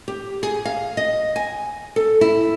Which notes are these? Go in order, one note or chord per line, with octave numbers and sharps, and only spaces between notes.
G4
G#4
F5
D#5
G#5
A4
E4